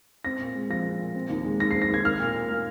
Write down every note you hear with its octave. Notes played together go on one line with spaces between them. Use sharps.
C4 A#6
A#2
G#3
F3 A#6
C4
A#2
C4
D#2
G#3
D#3 A#6
C7
C4
A#6
D#2 G#6
A#3 F6
A#2
A#2
A#3